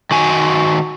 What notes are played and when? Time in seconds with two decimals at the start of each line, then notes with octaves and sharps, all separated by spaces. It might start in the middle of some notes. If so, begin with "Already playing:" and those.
0.11 D#3 F#4 G#5